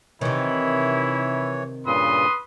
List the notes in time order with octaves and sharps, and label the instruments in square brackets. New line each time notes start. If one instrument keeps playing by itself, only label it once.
[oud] C3 D#3 [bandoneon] E3 C#5 [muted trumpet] E4
[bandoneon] G2 A#2 C#3 [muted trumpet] B4 [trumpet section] C6 D#6